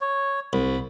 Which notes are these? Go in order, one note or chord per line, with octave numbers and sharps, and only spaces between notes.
C#5
C2 B5